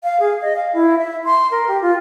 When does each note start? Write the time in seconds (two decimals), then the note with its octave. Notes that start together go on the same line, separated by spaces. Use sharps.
0.03 F5
0.20 G#4
0.42 D#5
0.56 F5
0.73 E4
0.98 E5
1.24 C6
1.51 A#4
1.68 G4
1.82 F4